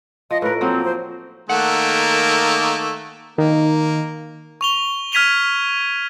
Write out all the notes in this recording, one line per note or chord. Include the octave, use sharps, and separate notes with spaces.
F3 D#5
A2 A#4 B4
F3 F#3 A#3 C4
C5
D#3 A3 A#3 F#5
D#3 A#3
C#6 F7 G7
F6 G#6 B6 D#7 F7 G7